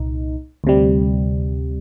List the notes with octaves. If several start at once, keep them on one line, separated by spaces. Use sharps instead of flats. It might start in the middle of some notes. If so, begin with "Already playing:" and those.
Already playing: C2 A#2 D#4
D2 C3 G3